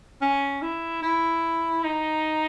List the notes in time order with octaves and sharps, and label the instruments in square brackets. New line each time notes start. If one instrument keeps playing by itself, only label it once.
[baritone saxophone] C#4
E4
E4
D#4